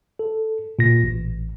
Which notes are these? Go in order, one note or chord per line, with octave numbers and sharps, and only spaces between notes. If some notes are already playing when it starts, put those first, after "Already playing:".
A4
A#2 A#6
A1